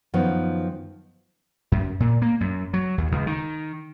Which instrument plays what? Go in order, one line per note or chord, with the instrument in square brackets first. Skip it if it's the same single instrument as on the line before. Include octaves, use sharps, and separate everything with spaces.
[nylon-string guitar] F#2 D#3 F3 B3
[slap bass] F#2
A#2
A#3
F#2
F#3
D#2
C#2
D#3